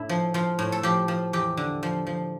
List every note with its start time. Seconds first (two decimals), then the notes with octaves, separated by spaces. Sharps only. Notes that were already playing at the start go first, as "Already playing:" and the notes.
Already playing: A2 D4 E4
0.09 F3
0.34 F3 F4
0.59 A2
0.72 A4
0.83 F3 G4
1.08 F3
1.33 E2 G4
1.57 D3
1.83 F3
2.07 F3